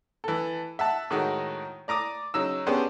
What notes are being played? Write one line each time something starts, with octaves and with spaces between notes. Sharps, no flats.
E3 A4
E5 F#5 A5
A2 D#3 G#3 D#4 F#4
D5 A#5 D6 D#6
C#3 F#3 D#4 E6
B3 C#4 D4 G4 G#4 C5